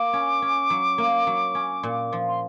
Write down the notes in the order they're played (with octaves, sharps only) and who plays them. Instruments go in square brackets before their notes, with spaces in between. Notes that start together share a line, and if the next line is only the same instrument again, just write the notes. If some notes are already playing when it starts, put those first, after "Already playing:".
Already playing: [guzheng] A#3 [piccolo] D6
[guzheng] C#4
C#4
F#3
A#3
F#3
C#4
A#2
F3
[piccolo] C6